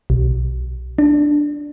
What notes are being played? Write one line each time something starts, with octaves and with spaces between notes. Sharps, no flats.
B1
D4